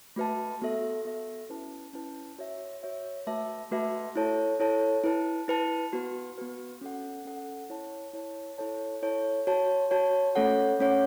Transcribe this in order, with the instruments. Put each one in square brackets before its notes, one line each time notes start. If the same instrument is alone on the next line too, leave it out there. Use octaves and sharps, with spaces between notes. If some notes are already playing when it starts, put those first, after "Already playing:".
[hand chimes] A3 F#4 B4 E5 A5
B3 F#4 A4 E5
B3 F#4 A4 E5
C#4 E4 B4 A5
C#4 E4 B4 A5
F#4 C#5 E5
F#4 C#5 E5
A3 F#4 B4 E5 A5
A3 F#4 B4 E5 A5
E4 A4 C#5 A5
E4 A4 C#5 A5
E4 B4 A5
E4 B4 A5
B3 F#4 B4
B3 F#4 B4
C#4 A4 F#5
C#4 A4 F#5
E4 C#5 A5
E4 C#5 A5
E4 A4 C#5 A5
E4 A4 C#5 A5
F#4 C#5 A5
F#4 C#5 A5
A3 C#4 A4 C#5 F#5
A3 C#4 A4 C#5 F#5